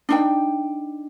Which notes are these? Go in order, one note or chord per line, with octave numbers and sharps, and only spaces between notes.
D4 D#4 G5